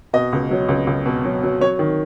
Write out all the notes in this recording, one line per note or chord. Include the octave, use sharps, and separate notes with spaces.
B2 D#5
C#2
F#3
C#2
C#2
B2
F#3
F#3
F#3 C#5
D#3